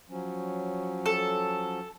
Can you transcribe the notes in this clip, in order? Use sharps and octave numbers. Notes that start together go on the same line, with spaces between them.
F3 F#3 C#4
A4